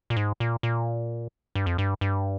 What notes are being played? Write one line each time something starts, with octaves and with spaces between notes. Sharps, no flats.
A#2
G#2
A#2
A#2
G2
F2
G2
G2